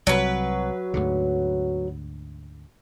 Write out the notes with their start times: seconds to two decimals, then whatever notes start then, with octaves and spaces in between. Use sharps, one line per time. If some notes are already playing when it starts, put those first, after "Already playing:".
0.07 C2 F#3 B4
0.94 D2 G#2 D3